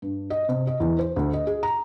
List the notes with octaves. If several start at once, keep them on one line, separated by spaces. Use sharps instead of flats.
G2
D#5
C3
D#5
E2
C5
D2
D#5
G#4
A#5